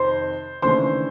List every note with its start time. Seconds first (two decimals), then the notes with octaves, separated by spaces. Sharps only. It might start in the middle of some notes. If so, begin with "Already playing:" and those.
Already playing: F2 C3 D#3 C5 C6
0.62 D#2 C#3 E3 A3 D4 C5 C6